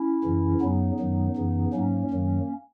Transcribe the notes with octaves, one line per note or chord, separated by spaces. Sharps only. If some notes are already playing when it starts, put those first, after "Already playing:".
Already playing: C#4 E4
F#2 C#3 E3
F#2 C#3 F#3 B3 D#4
F#2 D#3 F#3
F#2 C#3 E3
G#2 F#3 A#3 C#4
F#2 D#3 F#3